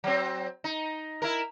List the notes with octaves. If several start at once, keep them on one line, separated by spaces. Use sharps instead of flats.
F#3 C4
D#4
E4 A#4